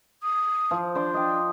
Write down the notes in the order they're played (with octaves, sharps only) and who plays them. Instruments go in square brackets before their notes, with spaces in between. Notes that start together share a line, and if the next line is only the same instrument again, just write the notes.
[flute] D#6
[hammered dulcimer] F3
[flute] D4 [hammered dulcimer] C5 D5 C6
[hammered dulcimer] D#5 G5